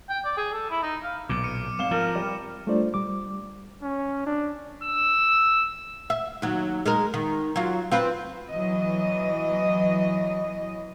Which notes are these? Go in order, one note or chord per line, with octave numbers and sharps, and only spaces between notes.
G5
D5
G#4
A4
E4
D#4
F5
B1 A#2 D6
F6 C#7 D#7
G#1 F5 E7 G7
F3 A#4
G3
G3 A3 D4 F4 C5 D5
G3 D6
C#4
D4
E6
E5
D#2 F#3
G#3 D#4 A#4
D#3
F#3 F4
C4 F4 B4
E3 F#3 D#5